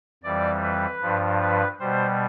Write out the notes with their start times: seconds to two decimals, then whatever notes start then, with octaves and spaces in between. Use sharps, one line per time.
0.23 F2 E3 G3 D5
0.63 B4
1.02 G2 F3
1.41 B4
1.80 B2 G3 C5